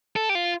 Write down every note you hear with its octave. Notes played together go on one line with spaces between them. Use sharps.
A4
G4
F4